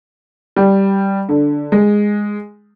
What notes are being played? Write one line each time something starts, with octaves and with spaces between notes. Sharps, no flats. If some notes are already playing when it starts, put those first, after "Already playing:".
G3
D3
G#3